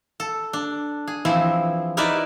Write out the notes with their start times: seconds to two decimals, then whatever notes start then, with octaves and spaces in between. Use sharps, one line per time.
0.20 A4
0.53 D4
1.07 G#4
1.25 E3 F3 C4 E4
1.97 D#4 E4 A#4 B4 D5 E5